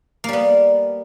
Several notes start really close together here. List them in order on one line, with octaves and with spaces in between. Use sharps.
A#3 G3 B3